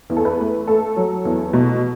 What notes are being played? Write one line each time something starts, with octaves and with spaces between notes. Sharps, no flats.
E2
A4
B4
A3
A3 A4
F#3
E2
B2